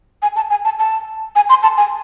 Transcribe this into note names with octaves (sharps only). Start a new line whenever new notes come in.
G#5
A5
G#5
A5
A5
G#5
C6
A5
G#5